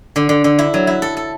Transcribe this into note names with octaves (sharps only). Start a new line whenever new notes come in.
D3
D3
D3
E4
F#3
E4
A4
A4